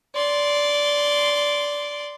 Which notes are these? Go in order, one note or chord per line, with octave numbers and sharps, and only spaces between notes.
D5 C6